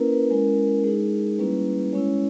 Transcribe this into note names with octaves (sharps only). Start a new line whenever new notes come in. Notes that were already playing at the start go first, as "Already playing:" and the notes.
Already playing: A#3 C#4 E4 A#4 B4
B4
G#3 C#4 E4 A#4
G#3 D#4 G#4
G3 A#3 C#4 E4 B4
G#3 C#4 E4 C#5